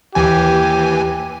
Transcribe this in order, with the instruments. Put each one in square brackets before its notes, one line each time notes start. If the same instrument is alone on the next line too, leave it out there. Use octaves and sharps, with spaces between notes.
[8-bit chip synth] D#2 E3 G#5 [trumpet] G4